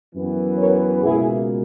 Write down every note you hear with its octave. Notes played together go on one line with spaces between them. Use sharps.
F#2 E3 B3
A#4 C#5
C#2 B2 A#3 E4 G#4